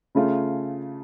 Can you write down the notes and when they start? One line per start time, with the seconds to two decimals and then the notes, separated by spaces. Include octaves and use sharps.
0.15 C#3 A3 C#4 F4